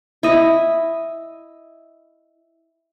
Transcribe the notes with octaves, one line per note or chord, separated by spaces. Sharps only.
E4 D#5